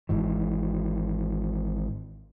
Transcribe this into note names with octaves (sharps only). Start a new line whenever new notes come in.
G#1 G#2 E3